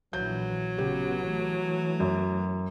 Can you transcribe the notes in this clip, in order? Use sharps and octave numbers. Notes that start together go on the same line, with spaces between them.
A#1 E3 F#3 G6
A1 C#3 B3 G4
E3 A3
F#2